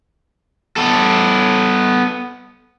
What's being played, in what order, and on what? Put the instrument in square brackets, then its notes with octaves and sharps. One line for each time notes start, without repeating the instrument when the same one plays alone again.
[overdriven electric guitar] B3 A4